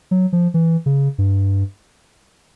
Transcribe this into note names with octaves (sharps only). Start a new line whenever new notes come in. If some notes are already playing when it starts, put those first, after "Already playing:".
F#3
F3
E3
C#3
G2